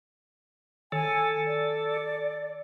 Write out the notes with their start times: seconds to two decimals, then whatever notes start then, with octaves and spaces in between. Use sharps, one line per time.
0.92 D#3 A4 G#5
1.46 D5